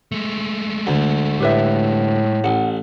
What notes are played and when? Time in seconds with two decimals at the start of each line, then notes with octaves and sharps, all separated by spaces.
0.12 G#3 A3
0.87 D2
1.40 A2 G4 B4 E5
2.44 A1 F#5